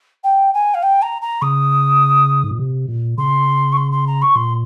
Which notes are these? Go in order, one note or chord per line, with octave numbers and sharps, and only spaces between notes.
G5
G#5
F5
G5
A#5
A#5
C#3 D#6
G#2
A#2
C3
A#2
C#3 C6
C#6
C6
C6
A#5
C#6
A#2 C6